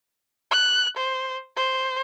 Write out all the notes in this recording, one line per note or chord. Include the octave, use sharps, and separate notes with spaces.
F#6
C5
C5